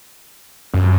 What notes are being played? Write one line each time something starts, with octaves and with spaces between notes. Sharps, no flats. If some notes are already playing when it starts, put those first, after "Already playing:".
F#2